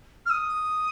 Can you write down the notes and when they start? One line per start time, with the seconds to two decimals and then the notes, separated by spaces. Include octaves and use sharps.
0.26 F6
0.30 D#6